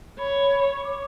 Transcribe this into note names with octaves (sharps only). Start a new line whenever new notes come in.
C#5 B5
C#6
D6